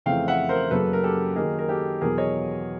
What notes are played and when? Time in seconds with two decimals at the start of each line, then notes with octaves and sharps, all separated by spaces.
0.06 F2 C#3 E3 A3 C4 F5 G5
0.28 E5 F#5
0.49 A#4 C5
0.71 F#2 C#3 F#3 A#3 A4 B4
0.93 A#4
1.03 G4 A4
1.36 D#3 F#3 A#3 D#4 G#4 A#4
1.59 A#4
1.69 G4 A4
2.01 E2 B2 F#3 G#4 A#4
2.18 C#5 D#5